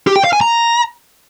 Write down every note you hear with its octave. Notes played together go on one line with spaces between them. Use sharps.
G4
G5
F5
G#5
A#5